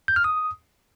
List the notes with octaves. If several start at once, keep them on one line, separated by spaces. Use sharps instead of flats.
G6
F6
D#6